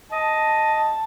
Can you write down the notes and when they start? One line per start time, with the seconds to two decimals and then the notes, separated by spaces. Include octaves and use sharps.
0.12 D#5 A5